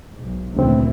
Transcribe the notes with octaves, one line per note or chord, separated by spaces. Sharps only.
B1 G#2
D2 A#2 C#3 E3 C4